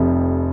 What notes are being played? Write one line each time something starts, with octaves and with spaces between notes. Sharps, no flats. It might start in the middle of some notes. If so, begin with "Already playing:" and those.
Already playing: F1 F2 C3